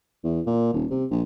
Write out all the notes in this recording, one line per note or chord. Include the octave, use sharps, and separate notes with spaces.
E2
A#2
D#1
C3
A#1